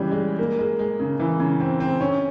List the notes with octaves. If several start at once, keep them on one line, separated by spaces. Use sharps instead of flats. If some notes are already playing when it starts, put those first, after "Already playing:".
Already playing: C#3 E3 G3
G#3
A#3
G#3
G#3
C#3
E3
C#3
C4
C4
C#4